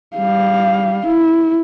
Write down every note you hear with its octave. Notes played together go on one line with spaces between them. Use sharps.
G3 F5
E4